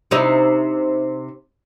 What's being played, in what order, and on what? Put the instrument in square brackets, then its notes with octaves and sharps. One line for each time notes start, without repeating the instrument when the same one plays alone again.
[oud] C3 D#4 E4